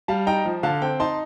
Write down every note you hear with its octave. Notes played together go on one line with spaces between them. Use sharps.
G3 F5 A5
D#4 G5 A#5
F3
D3 F5 A5
C4 G5
D#4 A5 C6